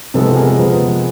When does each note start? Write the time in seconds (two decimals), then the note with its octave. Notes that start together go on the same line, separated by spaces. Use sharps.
0.14 C3 F3 G#3 B3 A4 B4
0.36 G#4 A#4
0.59 C3 F3 G#3 B3